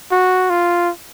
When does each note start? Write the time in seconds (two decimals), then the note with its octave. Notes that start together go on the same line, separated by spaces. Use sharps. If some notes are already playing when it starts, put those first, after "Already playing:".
0.12 F#4
0.50 F4